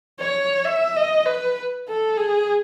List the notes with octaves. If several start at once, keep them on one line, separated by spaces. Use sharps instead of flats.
C#5
E5
D#5
B4
A4
G#4